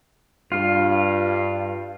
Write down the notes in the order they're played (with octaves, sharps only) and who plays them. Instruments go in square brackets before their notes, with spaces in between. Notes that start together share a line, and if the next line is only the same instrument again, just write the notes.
[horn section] G2 [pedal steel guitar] F4